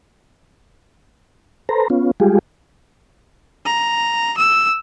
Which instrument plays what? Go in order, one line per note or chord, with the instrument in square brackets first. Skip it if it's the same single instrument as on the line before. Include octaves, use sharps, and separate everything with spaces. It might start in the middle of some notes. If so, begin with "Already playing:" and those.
[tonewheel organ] A4 B4 C5 A#5
B3 C#4 F4
G3 G#3 F4 G4 G#4
[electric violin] A#5
E6